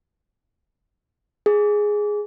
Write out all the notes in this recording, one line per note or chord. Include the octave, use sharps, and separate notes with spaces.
G#4